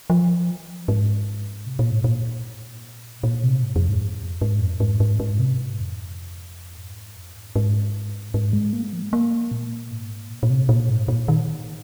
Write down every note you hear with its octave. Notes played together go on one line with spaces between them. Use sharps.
F3
G#2
C3
A#2
G#2
A#2
A#2
C3
G#2
F2
G#2
F2
G#2
F2
G#2
G#2
G#2
C3
G#2
F2
G#2
F2
G#2
G#2
G#2
G#3
A#3
G#3
F3
G#3
A#3
A#2
G#2
A#2
A#2
C3
A#2
G#2
A#2
D#3